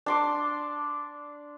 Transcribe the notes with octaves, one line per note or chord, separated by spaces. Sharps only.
D4 C6 D6